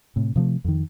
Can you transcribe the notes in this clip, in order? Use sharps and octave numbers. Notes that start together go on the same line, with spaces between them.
A2 C3
C3 F3 G#3 A3
F2 D#3